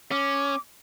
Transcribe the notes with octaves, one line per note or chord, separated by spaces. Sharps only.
C#4 D6